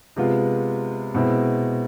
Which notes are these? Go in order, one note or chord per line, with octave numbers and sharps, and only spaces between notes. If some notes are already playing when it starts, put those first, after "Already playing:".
C3 G#3 B3 F4
B2 G#3 C4 E4